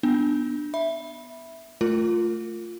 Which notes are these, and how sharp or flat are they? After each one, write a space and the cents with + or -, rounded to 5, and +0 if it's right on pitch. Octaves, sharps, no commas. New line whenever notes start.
B3 +0 D4 +15
E5 +0 B5 -10
A3 +5 F4 +0 A#4 -15